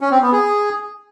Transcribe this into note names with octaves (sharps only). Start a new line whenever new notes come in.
C#4
C4
B3
G#4